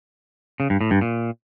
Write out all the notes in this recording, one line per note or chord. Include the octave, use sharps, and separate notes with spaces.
C#3
G2
A2
G2
A#2